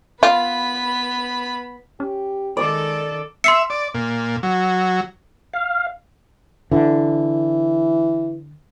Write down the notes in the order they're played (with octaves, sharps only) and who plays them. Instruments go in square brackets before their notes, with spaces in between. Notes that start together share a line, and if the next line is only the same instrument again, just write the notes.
[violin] B3 B5 [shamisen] F4
[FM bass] C#4 [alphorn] G4
[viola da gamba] D#3 A4 [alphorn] G#3 [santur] D5
[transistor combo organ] E5 [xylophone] C6 C7 C#7
[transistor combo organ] D5
A#2
F#3
[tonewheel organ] F5
[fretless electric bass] D3 [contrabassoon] E3